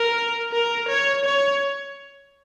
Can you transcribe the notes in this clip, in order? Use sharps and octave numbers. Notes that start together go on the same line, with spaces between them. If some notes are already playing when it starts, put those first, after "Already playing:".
Already playing: A#4
A#4
C#5
C#5